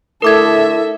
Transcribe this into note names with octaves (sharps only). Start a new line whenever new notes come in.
D3 A3 E4 A4 A#4 E5 D6 G#6